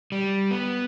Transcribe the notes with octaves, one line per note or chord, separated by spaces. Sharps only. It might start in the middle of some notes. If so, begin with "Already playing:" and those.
G3
B3